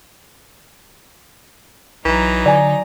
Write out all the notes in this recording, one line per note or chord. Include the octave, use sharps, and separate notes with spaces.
B1 E3 F#3 D#4 A#5
D3 D5 G#5